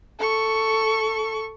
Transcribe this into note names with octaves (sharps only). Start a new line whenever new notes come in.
A4 C#6